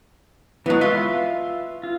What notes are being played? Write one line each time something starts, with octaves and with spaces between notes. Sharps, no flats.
E3 F#3 G#3 B3
F4 B4 E5 F5
F4